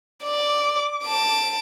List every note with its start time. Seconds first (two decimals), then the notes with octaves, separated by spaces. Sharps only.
0.24 D5 D6
1.04 A5 D7